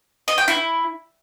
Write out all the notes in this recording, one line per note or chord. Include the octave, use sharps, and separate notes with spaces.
D#5
G5
E4